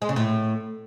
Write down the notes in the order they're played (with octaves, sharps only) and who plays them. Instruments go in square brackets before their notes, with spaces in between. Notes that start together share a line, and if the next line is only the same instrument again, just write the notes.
[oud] G#3
C#3
A2